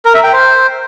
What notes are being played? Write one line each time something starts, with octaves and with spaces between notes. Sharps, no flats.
A#4
E5
G5
C5